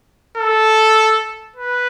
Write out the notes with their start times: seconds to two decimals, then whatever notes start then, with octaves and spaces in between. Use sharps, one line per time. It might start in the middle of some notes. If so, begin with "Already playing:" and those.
0.38 A4
1.56 B4